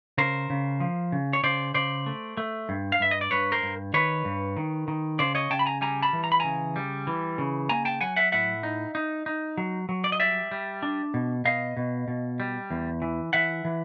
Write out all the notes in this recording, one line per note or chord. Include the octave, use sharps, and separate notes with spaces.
C#3 A#4 C5
C#3
F3
C#3
C#5
C#3 C5 D5
C#3 C5 D5
A3
A3
G2
F5
G2 E5
D#5
D5
G2 B4 C#5
A#4 C5
G2
D#3 B4 C#5
G2
D#3
D#3
C#3 C5 D5
C#5 D#5
C#3 G5 A5
B5
G#5 A#5
G3 G#5 A#5
A5 B5
E3
A#5
B5
C#3 G#5 A#5
G3
E3
C#3
A#3 G#5 A#5
G5 A5
F#3 F#5 G#5
E5 F#5
A2 E5 F#5
D#4
D#4
D#4
F#3
F#3
D5
D#5
G3 D5 E5
G3
D4
B2
B2 D#5 F5
B2
B2
G3
E2
E3
E3 E5 F#5
E3